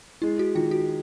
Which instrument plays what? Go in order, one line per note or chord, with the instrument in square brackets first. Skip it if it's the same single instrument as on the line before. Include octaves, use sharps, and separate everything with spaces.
[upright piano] G#3 [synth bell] E4
[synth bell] F#4
[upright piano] D#3 [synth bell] F4
[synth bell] F#4